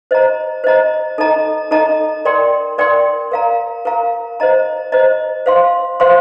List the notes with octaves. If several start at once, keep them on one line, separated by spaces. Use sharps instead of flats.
C5 D#5 A#5
C5 D#5 A#5
D#4 A4 D#5 A#5
D#4 A4 D#5 A#5
A#4 D5 G5 C6
A#4 D5 G5 C6
A#4 F5 A#5
A#4 F5 A#5
C5 D#5 A#5
C5 D#5 A#5
C5 F5 C6
C5 F5 C6